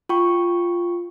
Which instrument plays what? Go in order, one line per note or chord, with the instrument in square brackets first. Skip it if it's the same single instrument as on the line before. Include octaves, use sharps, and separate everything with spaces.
[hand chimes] F4 G5 C#6